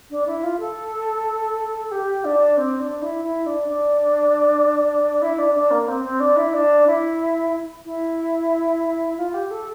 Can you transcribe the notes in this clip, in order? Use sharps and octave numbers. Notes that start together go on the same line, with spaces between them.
D4
E4
F4
A4
G4
D4
C4
D4
E4
E4
D4
D4
E4
D4
D4
A#3
C4
C4
D4
E4
D4
E4
E4
F4
G4
A4